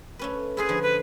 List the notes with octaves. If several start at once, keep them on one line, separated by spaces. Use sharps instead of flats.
A3 C#4 B4
E4 F4 G#4 B4
D3 F3
B4